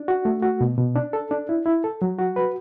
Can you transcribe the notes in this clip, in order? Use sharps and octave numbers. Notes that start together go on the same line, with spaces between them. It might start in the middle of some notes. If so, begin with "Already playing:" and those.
Already playing: D4
F#4
A3
F#4
B2
B2
D4
A4
D4
E4
E4
A4
F#3
F#4
B4